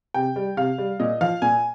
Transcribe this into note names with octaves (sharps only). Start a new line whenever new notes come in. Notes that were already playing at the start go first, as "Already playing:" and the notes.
C3 G5
G3
C3 F5
G3
A#2 D#5
F3 F5
A#2 G#5